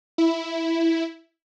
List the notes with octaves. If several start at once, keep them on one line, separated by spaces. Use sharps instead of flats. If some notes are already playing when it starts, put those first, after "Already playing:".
E4